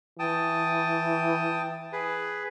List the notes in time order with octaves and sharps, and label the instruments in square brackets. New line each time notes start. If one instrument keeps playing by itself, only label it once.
[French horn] E3 [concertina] G5 A5 D#6
[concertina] G#4 B4